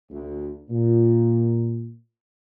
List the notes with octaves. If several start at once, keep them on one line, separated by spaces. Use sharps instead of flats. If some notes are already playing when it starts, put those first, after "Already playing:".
D2
A#2